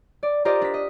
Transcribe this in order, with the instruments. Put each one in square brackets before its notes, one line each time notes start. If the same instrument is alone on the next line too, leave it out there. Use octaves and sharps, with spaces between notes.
[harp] D5
F4 G4 A#4 C5 D5 D#5
D4 B6
D#5